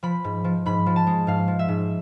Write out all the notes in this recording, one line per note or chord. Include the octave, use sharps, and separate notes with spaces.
F3 B5
G#2
F3
G#2 B5
F3
A5
G#3
G#2 F5
F3
E5
G#2